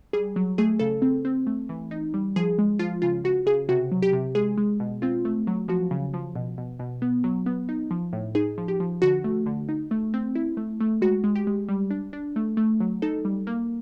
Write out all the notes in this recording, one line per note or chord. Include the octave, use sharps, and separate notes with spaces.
G3 G#4
F#3
A3 G#4
C#3 A4
C4
C4
A3
E3
D#4
G3
F3 G#4
G#3
F3 F4
C#3 F4
C#3 F#4
C#3 G#4
C3 F#4
F#3
G4
C3
G#3 G#4
G#3
B2
C4 F4
A3
F#3
F3 F#4
C#3
F3
B2
B2
B2
B3
F#3
B3
D#4
F3
A2
D#4 G#4
F3
G4
F3
D3 F#4
A3
D3
D#4
A3
C4
E4
A3
A3
G#3 F#4
G#3
G4
G#3
G3
D4
D4
A3
A3
F#3
D#4 A4
G3
A#3